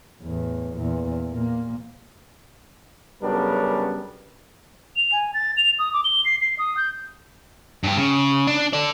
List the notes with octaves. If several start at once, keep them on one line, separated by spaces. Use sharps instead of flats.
E2 A2
E2 A#2
A#2 A#3
F#2 C#3 G3 B3 D4 A#4
F7
G#5
A6
F7
D#6
D6
G7
C7
C7
D#6
G6
G2 G4
C#3
D4
A4 D5